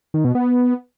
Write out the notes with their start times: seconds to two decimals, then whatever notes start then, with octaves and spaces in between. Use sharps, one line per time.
0.14 D#3
0.24 B2
0.35 B3